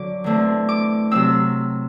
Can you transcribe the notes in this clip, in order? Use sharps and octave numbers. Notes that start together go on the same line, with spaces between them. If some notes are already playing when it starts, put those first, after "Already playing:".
Already playing: D3 F#3 D6
E2 D3 A3 C4
D6
C3 F#3 C4 E6